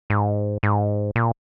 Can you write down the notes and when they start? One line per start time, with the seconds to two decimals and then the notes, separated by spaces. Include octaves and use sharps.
0.10 G#2
0.63 G#2
1.16 A#2